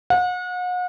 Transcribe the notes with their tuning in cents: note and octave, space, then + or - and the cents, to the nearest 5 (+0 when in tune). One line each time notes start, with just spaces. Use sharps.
F#5 -40